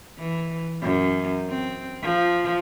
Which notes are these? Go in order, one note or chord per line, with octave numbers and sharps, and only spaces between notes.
E3
F#2
C4
F3